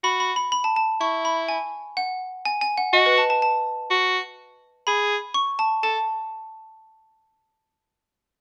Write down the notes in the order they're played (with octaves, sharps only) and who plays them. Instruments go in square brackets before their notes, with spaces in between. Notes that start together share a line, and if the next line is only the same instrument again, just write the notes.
[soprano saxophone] F#4 [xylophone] B5
[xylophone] B5
B5
B5
A5
A5
[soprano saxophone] E4 [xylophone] C#6
[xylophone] B5
G#5
F#5
G#5
G#5
F#5
[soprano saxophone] F#4 [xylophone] D#5
[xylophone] B4
A5
A5
A5
[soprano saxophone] F#4
[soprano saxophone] G#4 [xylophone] B5
[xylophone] C#6
A5
[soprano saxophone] A4 [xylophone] A5